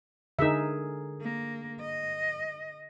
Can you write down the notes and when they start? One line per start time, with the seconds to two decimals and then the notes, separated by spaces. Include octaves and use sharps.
0.39 D3 D#4 G#4 A#4 E5
1.21 A#3
1.80 D#5